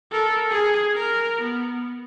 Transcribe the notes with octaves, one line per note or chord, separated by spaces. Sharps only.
A4 A#4
G#4 G#5
A#4 F6
B3